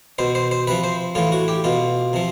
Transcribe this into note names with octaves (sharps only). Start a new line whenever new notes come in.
B2 C5
C5
C5
C3 F3 B4
C5
A2 E3 F4
F#4
G4
B2 F4
C3 F3